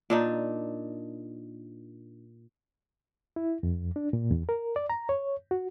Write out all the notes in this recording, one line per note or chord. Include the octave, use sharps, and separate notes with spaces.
A#2 D4 D#4
E4
F2
D4
A#2
E2
A#4
D5
A#5
C#5
F#4